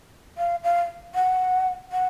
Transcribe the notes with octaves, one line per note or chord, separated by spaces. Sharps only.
F5
F5
F#5
F#5